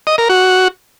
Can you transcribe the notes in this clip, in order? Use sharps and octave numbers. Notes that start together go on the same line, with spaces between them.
D#5
A#4
F#4